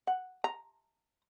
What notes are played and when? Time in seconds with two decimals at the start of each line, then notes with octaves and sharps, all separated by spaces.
0.07 F#5
0.44 A#5